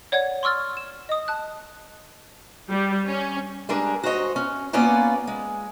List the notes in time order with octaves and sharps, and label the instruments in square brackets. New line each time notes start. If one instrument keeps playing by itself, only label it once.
[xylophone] C#5 D5 F#5 G#6
C6 C#6 E6 F6 A6
E7
D#5 D#6
A5 F#6
[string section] G3
C#4
[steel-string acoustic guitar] G3 G#3 D4 A#4
F#4 C5 C#5 D#5
C#4
A#3 B3 C#4 F4 B4 D5
G#3